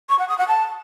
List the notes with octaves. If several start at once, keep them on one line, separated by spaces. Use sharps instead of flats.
C#6
F#5
D#6
F#5
A5